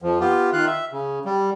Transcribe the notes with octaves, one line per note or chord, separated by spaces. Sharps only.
F2 F3
B3 F4 G4
D#3 F4 F5 F#6
E5
C#3
G3